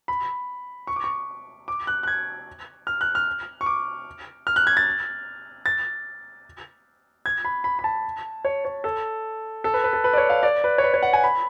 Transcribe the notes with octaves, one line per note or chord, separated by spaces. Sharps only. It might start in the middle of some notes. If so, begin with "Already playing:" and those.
B5
C#6
D6
C#6
D6
F#6
F#6
G#6
F6
F#6
F6
C#6
D6
F6
F#6
G#6
A6
A6
G#6
B5
B5
B5
A5
C#5
C#5
A4
A4
B4
B4
A4
B4
D5
C#5
F5
D5
B4
C#5
B4
C#5
F#5
G#5
B5